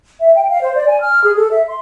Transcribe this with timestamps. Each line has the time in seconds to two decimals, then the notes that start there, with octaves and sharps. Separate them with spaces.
0.20 E5
0.34 G5
0.49 F5
0.62 C5
0.75 D5
0.88 G#5
1.00 F6
1.22 G#4
1.37 A4
1.50 E5
1.68 C6